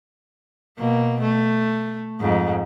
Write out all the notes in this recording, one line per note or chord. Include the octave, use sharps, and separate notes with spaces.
B2 A#3
A3
F2 G#2